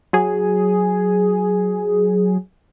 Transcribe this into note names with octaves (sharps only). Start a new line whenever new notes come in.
F#3 G#4